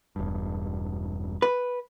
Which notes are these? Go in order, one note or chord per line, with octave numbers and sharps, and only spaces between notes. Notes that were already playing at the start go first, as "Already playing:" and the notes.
E1 G2
B4